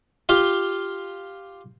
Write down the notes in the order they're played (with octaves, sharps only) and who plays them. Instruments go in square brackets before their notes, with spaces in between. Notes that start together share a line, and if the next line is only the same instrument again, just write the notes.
[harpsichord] F4 G4 F5